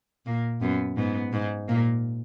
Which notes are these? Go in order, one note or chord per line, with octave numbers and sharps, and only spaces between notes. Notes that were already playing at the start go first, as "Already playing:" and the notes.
A#2 A#3
F#2 B3
G#2 B3
G#2
A#2 A#3